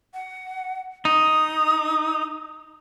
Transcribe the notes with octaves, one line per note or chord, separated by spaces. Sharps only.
F#5
D#4 D#6